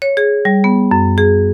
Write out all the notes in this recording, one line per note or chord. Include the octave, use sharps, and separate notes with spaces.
C#5
G#4
G3
B3
F#2
G#4